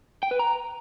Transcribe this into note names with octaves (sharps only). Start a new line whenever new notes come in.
G5
B4
A#5